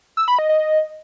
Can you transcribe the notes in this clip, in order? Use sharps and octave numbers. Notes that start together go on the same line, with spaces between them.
E6
B5
D#5
D#5